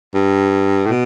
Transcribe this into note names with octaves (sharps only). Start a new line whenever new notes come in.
G2
A2
B2